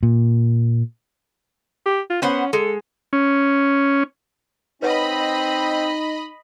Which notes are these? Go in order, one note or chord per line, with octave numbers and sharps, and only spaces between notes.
A#2
G4
F4
B3 C#4 C5 F#5
G#3 A4
C#4
C4 D#4 B4 C#5 D#5 F#5 B5